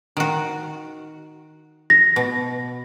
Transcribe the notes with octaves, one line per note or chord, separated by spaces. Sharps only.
D#3 F#4
A#6
B2